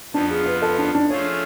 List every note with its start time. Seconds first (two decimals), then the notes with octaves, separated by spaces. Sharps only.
0.14 F2 F3 B3 D4
0.30 G#4
0.46 B4
0.62 A4
0.78 D4
0.94 D4
1.10 F3 A3 F4 G#4 C#5